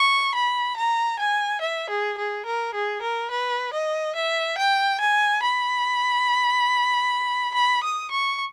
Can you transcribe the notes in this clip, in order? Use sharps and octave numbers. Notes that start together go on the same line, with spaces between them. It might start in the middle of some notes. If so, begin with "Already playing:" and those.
Already playing: C#6
B5
A#5
G#5
E5
G#4
G#4
A#4
G#4
A#4
B4
D#5
E5
G5
G#5
B5
B5
D#6
C#6